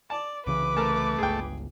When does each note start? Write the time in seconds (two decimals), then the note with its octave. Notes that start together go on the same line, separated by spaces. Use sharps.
0.10 D5 A5
0.47 C2 C#3 E3 B4 D6
0.77 A3 A#4 A5
1.19 G1 C#2 G#4 G5